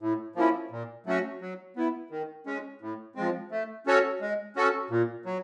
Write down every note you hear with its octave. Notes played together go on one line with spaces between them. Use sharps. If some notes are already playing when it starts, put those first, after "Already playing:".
A2
F3 A#3 C#4 E4
A#2
F#3 A3 C#4 F#4
F#3
B3 E4
D#3
G#3 C#4
A2
F3 G#3 C4
A3
C#4 F#4 A4 C#5
G#3
C#4 F#4 A4
A#2
F#3